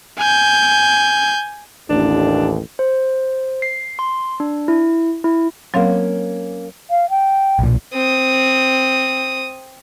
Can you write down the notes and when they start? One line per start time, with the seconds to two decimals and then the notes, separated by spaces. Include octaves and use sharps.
0.19 G#5 G6
1.89 A1 D#2 D4
2.79 C5
3.62 C7
3.99 C6
4.40 D4
4.68 E4
5.24 E4
5.74 F#3 A#3 C4 C#4 F5
6.90 F5
7.10 G5
7.59 B1 A#2
7.93 C4 D#6